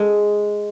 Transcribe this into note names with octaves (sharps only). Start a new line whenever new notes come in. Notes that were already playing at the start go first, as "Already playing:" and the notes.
Already playing: G#3 A4